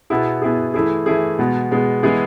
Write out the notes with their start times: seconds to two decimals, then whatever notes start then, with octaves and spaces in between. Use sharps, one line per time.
0.10 B2 B3 E4 G#4
0.42 B2 B3 E4 G#4
0.74 E3 A3 E4 G#4
1.06 E3 A3 E4 G#4
1.39 B2 G#3 B3
1.71 B2 G#3 B3
2.03 E3 G#3 B3 E4 G#4